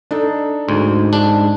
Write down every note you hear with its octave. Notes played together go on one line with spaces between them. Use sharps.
D4 D#4 A4
D2 G#2
G#3 D4